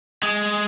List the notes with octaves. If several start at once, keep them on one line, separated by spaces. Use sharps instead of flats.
G#3